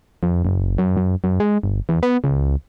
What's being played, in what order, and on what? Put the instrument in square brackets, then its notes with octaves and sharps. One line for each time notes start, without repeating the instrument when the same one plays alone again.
[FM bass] F2
F#1
F#2
F#2
F#2
G#3
G1
E2
B3
C#2